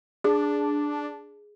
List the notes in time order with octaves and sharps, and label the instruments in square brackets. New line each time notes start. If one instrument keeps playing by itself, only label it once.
[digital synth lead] D4 [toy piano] G#4